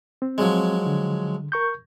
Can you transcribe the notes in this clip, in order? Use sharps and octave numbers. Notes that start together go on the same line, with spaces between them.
C4
F3 F#3 G#3
D3
A#4 C#6 G6